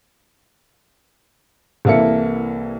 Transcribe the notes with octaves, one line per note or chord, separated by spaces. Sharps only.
C2 E3 A#3 A4 E5 C#7